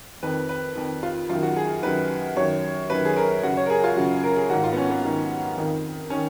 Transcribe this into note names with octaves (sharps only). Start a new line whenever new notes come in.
F2 D#3 B4
B4
F2 D#3
F4
F#2 D#3 F4
F#4
G#4
F#2 D#3 B4
F#2 D#3 C#5
F#2 D#3 B4
G#4
A#4
F#2 C#3 F#4
C#5
A#4
G#4
F4
F#2 C#3 F#4
A#4
G#4
G#2 D#3 F#4
F4
B3
C#4
B3
G#2 D#3
F2 D#3
D#3 C#4